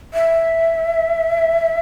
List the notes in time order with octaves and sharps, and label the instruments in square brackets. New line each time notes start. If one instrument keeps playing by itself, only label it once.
[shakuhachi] E5